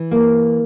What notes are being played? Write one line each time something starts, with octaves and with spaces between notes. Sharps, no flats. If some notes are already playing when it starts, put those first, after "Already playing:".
Already playing: E3
A#3